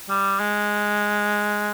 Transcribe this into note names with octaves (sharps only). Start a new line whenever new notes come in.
G3
G#3